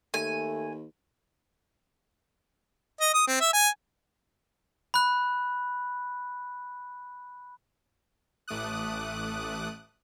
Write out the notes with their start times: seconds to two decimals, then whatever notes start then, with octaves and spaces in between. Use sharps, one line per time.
0.14 D#2 A3 G#5
3.01 D#5
3.14 D#6
3.27 C4
3.41 E5
3.53 G#5
4.94 B5 F#6
8.48 A1 A3 D6 D#6 F#6